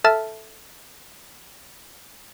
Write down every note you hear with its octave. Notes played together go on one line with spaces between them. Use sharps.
A4 E5 A5 F6 A6